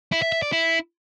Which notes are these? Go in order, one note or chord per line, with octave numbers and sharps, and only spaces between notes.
E4
E5
E5
D5
E4